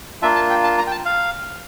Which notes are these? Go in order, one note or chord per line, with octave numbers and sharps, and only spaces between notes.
A#3 D4 F4 E5
A5
G5
A5
A#5
G5
A5
F5